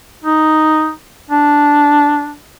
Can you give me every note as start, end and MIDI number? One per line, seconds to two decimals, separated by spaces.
0.24 0.91 63
1.30 2.34 62